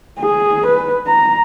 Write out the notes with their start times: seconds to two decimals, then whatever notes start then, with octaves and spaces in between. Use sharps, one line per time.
0.20 G#4
0.66 B4
1.07 A#5